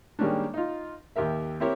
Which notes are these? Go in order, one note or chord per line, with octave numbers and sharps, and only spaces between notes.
D#3 G3 G#3 A#3 C#4 D4
D#4 F4
D#2 G4 A#4 E5
C4 E4 G4 A#4 C#5